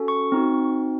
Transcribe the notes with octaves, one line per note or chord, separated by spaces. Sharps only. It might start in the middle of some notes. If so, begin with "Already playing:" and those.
Already playing: C#4 F#4 A4
C#6
C4 D#4 F#4